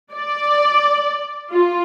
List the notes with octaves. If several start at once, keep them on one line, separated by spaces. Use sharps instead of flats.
D5
F4